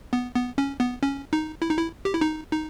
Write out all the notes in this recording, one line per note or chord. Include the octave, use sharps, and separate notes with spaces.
B3
B3
C#4
B3
C#4
D#4
E4
D#4
E4
G4
E4
D#4
D#4